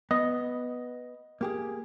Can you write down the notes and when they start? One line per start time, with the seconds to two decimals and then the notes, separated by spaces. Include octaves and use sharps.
0.11 B3 D#5
1.41 A#3 G4 G#4